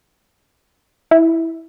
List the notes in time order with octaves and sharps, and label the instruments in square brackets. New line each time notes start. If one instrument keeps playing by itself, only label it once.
[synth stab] E4